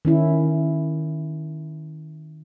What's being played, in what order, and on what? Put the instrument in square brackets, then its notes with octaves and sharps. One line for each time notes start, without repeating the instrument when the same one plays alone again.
[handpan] D#3 C#4 E4